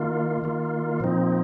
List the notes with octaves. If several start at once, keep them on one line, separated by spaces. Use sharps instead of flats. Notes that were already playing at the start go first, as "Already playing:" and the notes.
Already playing: D#3 A#3 F4
D#3 A#3 F4
A#2 F3 C4 D#4